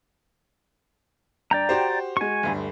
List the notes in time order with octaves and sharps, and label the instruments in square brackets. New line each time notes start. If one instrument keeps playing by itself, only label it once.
[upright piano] G2 [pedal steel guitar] D5 G5 A#5
[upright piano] F#4 G4 C5
[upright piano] G#3 F#4 [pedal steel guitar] G#5 C#6
[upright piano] G1 D2 G3